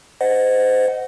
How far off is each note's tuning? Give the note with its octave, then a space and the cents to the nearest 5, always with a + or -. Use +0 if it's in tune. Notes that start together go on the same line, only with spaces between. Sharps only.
C5 -25 D#5 -5 F#5 +0